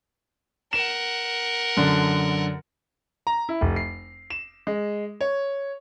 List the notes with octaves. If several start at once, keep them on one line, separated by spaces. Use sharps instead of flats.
A#4 F#5 E7
F#2 D3
A#5
E4
F1
C7
E7
G#3
C#5